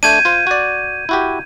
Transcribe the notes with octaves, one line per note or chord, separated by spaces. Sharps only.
A3 D4 G6 G#6 D#7
F4 C5
F#4 D5
E4 F#4 G4